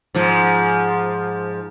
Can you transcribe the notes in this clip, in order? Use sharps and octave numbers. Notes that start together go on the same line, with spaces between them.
G#2 F3